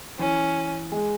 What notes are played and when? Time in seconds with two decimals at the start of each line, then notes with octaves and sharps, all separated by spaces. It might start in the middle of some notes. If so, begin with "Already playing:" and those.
0.19 E3 C#4
0.92 G#3